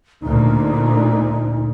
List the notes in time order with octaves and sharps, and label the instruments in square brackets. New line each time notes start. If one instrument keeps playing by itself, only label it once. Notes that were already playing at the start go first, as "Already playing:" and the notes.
[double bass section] D2 A#2 [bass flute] D#4